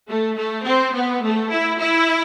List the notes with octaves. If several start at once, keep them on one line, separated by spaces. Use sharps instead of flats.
A3
A3
C4
B3
A3
E4
E4